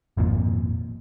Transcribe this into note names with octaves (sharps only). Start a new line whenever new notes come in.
G#1 F2 A#2